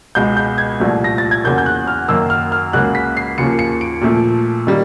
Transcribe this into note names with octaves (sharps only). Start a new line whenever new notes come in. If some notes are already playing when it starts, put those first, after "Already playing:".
C#2 B2 G#3 G6
G6
G#6
C2 A#2 F3 A3
A#6
A6
G#6
E2 C#3 F#3 A#3 G6
G6
F#6
F6
F#2 D#3 F#3 A#3 E6
F6
F6
C#2 C#3 F#3 A#3 F#6
B6
C7
D#2 C#3 F3 A#3 C#7
C#7
D7
A#2 F3 A3
D#3 G3 A#3